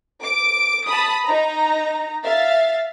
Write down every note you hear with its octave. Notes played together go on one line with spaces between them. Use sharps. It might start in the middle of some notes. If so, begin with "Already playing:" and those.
D6 D7
A5 B5 D#6
D#4 A#5
E5 F5 A6